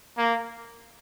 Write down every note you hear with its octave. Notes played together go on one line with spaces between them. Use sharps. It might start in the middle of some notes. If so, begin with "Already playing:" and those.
A#3